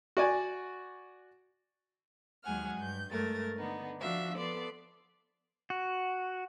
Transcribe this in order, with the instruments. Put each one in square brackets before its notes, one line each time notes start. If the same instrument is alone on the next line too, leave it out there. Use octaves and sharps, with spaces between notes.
[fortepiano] F#4 D5 G#5
[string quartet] D#2 F#3 G#3 F#5 G#5 F6
G2 G6
G2 G#3 A3 A#4 A6
D3 B3 D#4
F3 D4 F#4 E5 F5
B3 A4 D5 C6
[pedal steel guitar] F#4